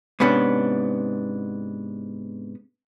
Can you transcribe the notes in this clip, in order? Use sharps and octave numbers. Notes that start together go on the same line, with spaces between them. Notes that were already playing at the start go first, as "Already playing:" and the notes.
G#2 C3 B3 C#4 D4